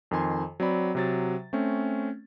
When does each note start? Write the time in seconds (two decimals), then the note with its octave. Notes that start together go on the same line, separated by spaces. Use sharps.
0.11 F2 D#3 G#5 C6
0.60 F#3 C4 D5 B5
0.95 C3 F#3 A6
1.53 A3 C4 C#4